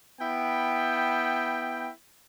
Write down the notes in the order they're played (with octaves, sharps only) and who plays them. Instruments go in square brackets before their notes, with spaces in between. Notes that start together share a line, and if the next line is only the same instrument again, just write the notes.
[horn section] B3 E4 G5